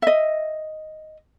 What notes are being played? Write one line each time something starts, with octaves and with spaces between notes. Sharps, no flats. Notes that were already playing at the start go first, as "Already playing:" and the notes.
D#5 E5